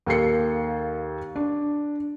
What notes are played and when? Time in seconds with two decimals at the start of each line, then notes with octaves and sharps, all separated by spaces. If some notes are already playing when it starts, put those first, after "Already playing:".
0.06 D#2 A#3 A4 F5 C7 C#7
1.36 D4